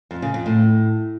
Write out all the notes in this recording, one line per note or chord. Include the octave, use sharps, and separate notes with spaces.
F2
C#3
F2
A2